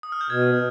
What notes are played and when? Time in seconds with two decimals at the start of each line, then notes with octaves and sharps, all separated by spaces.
0.03 D#6
0.12 F6
0.21 G6
0.30 B2 G#6